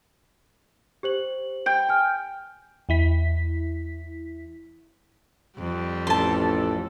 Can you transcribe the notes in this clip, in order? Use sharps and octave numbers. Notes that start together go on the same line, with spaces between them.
G4 C5 F#7
G5
G#5 F6
E2 E4 B6
F2 G3
A1 A4 A5 C6